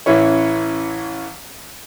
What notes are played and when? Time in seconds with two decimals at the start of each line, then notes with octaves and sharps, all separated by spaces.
0.06 A1 E3 C#4 E4 C#5